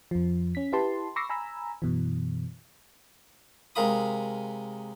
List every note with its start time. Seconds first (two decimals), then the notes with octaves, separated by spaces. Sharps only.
0.11 F2 F3
0.55 C#4 B6
0.73 E4 G4 B4 A5 C6
1.16 B5 C#6 D6 E6 A#6 C7
1.30 G#5 A#5 B5 E6
1.82 F#2 B2 E3
3.75 C3 G#3 A#4 F5 B5 D#6